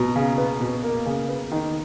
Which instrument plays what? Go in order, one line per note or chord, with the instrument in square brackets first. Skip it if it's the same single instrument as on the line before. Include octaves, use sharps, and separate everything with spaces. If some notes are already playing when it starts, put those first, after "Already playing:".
Already playing: [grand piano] B2 A#5
C#3
B3
B2
A#3
C#3
B3
D#3